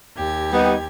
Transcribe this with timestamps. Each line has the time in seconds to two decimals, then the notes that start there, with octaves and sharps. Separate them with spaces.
0.17 D#2 G4 G#6
0.52 G3 B3 D#4